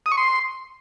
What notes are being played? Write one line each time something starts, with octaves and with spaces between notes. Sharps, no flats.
D#6
C#6
C6